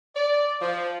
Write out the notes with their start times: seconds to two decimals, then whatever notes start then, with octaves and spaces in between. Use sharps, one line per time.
0.16 D5
0.60 F3